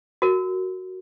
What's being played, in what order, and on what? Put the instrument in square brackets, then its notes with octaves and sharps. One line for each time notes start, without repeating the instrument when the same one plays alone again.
[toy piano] F#4 A#4